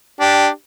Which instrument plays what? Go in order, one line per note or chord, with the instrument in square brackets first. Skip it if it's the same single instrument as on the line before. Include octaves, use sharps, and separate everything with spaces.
[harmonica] D4 G4